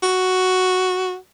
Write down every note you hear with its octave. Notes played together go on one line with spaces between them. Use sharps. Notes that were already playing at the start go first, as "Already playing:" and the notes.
F#4